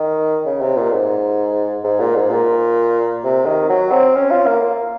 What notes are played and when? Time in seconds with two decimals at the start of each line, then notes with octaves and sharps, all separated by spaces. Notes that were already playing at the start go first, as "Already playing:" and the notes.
Already playing: D#3
0.45 C#3
0.61 C3
0.77 A#2
0.92 G#2
1.84 G#2
2.00 A#2
2.16 G#2
2.30 A#2
3.24 C3
3.46 D#3
3.69 F#3
3.92 C4
4.16 C#4
4.31 F4
4.47 A#3
4.62 A#3